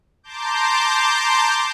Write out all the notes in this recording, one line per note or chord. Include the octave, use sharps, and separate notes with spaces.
A5 A#5 C6 D6 G6